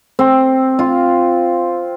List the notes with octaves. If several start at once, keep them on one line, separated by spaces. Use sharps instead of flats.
C4
F4